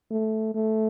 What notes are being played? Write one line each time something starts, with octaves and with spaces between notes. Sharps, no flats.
A3
A3